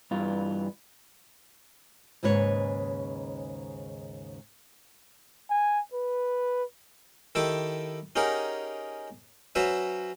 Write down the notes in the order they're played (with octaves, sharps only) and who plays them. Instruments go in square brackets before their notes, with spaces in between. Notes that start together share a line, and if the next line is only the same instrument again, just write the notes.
[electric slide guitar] G2 E3 F4
[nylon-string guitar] D#2 G#2 C#3 B4 C#5
[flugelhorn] G#5
B4
[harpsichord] D#3 E4 G4 A4 D6
C#4 D#4 G4 G#4 A#4 F#5
F#3 C#4 F#4 B4 C5 E5